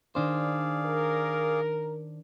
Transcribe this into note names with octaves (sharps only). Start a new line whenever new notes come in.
D#3 D4 G#4 C5 D5 F5
A#4